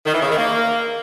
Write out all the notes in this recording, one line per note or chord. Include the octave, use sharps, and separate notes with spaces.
D#3
E3
C#3
D#3
A#3